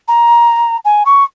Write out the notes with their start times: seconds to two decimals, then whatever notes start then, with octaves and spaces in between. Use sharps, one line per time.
0.08 A#5
0.85 G#5
1.05 C#6